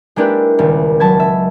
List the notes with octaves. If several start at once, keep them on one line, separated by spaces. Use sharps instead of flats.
G#3 A#3 D4 E4 G4 B4
D#1 C#2
F#3 A5 B5 G#6
E5